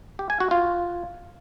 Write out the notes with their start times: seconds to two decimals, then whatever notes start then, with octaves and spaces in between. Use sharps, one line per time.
0.19 G4
0.30 G#5
0.40 F#4
0.51 F4